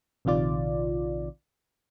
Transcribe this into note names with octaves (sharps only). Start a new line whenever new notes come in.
A#1 C3 D#3 F4 D5